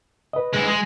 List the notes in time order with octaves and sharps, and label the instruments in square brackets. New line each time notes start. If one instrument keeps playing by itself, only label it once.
[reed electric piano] B4 D#5
[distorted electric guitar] G#3 E4
G#3